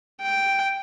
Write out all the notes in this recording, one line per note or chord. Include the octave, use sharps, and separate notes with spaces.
G5